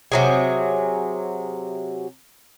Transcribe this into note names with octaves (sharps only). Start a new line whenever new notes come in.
C3 F#3 G#4